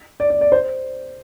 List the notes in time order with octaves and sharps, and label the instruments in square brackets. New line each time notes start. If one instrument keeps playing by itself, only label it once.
[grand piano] D5
D5
D5
C5